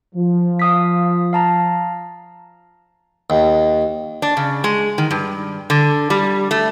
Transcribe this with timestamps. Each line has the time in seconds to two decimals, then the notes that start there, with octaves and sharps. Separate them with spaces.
0.15 F3
0.59 F5 D#6 B6
1.33 F5 A5 A#5
3.30 D#2
4.22 D4
4.37 C#3
4.64 G#3
4.98 D#3
5.11 G2
5.70 D3
6.10 G3
6.51 A3